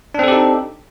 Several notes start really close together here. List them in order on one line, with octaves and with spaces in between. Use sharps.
D4 C4 A4 G4 D#4